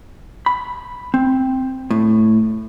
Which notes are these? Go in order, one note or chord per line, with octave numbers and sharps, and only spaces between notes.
B5
C4
A2